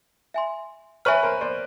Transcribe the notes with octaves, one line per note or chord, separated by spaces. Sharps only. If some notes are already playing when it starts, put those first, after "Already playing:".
E5 G#5 C6
B4 C#5 E5 G#5 C#6 F6
A#4 C5
C5 D5